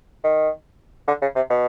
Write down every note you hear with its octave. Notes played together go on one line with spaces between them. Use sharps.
D#3
D3
C#3
C3
B2